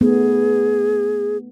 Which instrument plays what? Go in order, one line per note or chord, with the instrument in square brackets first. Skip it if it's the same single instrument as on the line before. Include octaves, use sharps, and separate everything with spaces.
[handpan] A3 B3 D#4 [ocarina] G#4